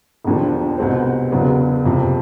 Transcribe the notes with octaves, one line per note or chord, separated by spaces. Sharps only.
E1 D#2 D3 F3
C2 B2 G#3 C4
E1 E2 C#3 F#3 B3
F#1 F2 C3 F3